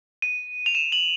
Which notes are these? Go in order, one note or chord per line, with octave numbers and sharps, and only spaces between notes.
D#7
F7
E7
F#7